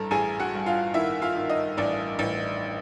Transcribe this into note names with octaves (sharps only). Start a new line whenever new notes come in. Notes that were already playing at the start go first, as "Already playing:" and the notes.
Already playing: A1 G2 A4 A#5
A1 G#4 G#5
F#4 F#5
G2
F4 F5
D#3 E4 E5
F4 F5
D#3
D#4 D#5
A1 D4 D5
A1